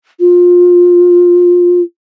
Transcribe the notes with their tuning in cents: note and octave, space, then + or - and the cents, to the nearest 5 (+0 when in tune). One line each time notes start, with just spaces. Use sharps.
F4 +20